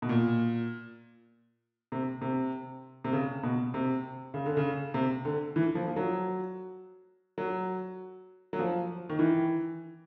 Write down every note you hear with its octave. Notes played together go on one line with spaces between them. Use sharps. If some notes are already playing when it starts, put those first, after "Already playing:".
B2
A#2
C3
C3
C3
C#3
B2
C3
C#3
D3
C#3
C3
D3
E3
F3
F3
F#3
F#3
F#3
F3
D#3
E3